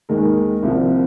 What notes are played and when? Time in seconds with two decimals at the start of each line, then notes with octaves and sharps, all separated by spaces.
0.09 D#2 D#3 G#3 A#4
0.63 C2 C3 F3